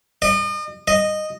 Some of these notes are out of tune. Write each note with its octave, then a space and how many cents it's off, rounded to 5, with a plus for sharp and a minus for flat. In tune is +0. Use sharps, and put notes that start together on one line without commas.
D#5 -40
D#5 -10